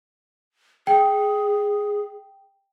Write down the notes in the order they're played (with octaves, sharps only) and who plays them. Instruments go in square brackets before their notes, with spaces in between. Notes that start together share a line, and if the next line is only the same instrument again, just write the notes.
[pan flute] G#4 [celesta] G5